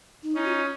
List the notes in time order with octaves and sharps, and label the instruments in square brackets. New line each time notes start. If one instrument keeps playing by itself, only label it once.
[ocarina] D#4
[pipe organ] C#4 D#4 [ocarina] E4
[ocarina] F#4
F4